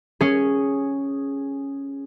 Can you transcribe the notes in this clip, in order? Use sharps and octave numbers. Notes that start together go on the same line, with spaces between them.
C#4 G#4